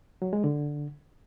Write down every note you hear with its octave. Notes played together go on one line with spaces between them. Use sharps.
F#3
G#3
D3